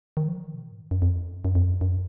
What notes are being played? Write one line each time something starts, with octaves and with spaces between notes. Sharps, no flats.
D#3
F3
D#3
B2
G#2
F#2
F2
F#2
F#2
F2
F#2
F#2